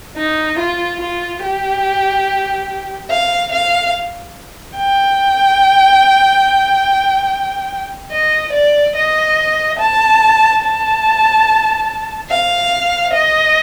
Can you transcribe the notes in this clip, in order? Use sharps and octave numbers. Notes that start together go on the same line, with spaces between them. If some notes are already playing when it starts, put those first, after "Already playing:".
D#4
F4
F4
G4
F5
F5
G5
D#5
D5
D#5
A5
A5
F5
D#5